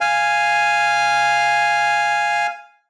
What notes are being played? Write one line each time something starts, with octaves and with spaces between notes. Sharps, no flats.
F5 G#5